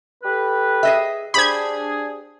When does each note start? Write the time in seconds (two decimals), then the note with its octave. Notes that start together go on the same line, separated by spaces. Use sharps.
0.23 G4 A4 B4
0.83 G#4 D#5 E5
1.34 D4 G4 G#4 C5 B5 G#6